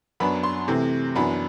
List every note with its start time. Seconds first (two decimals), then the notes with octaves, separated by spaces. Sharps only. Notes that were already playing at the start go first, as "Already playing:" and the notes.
0.20 F#2 F#3 B3 D4 B5
0.43 C6
0.68 C3 E3 A3 C4
1.16 F#2 E3 B3 D4 B5